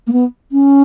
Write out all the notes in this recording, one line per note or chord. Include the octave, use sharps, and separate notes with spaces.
A#3
B3
C#4